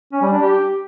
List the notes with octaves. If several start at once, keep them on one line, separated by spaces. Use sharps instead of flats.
C#4
G3
D4
G4